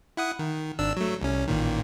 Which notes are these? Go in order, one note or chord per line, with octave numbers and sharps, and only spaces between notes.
E4 F#5 D#6
D#3
G#1 D4 E6
F#3 A3
C2 C#4
A1 A#2 D#3